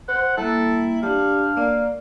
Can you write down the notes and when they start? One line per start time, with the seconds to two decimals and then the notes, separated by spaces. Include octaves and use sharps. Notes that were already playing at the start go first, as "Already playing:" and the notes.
0.09 C5 F#5
0.37 G3 A#3 E4 A4
1.03 G3 D4 F5 A5
1.57 A#3 D5